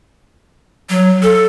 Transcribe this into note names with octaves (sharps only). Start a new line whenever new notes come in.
F#3
A4